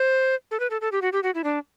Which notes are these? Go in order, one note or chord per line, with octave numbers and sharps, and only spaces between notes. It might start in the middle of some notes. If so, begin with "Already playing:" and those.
Already playing: C5
A4
B4
A4
A4
G4
F#4
G4
F#4
E4
D4